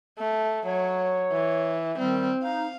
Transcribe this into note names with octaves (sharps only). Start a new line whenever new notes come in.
A3
F#3 C#5
E3
D#3 G3 C4
D#4 F5